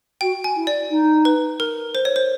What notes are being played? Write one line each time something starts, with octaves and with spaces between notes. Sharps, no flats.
F#4 G5
G#5
E4
D5
D#4
B4
A#4
C5
C#5
C5